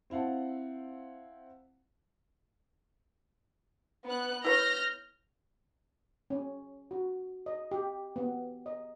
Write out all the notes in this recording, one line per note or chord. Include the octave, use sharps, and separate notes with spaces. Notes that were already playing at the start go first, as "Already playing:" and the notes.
C4 E4 F5 F#5 A5
B3 F#6
E4 B4 C#5 F6 G6 A#6
C#4
F#4
D#5
G4
B3
D#5